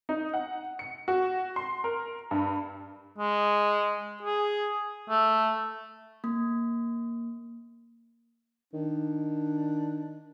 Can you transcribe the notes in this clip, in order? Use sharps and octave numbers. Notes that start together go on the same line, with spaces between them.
D#4
F#5
C#7
F#4
C6
A#4
G2
G#3
G#4
A3
A#3
D#3 D4